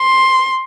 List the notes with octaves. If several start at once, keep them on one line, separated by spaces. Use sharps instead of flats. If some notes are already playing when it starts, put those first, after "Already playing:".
Already playing: C6